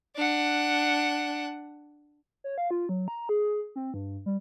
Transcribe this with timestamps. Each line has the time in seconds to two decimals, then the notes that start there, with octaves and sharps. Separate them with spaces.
0.16 D4 F#5
2.44 C#5
2.58 F5
2.71 F4
2.89 F#3
3.08 A#5
3.29 G#4
3.76 C4
3.94 G2
4.26 G3